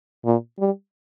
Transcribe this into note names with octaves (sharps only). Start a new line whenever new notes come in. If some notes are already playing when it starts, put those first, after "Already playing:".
A#2
G3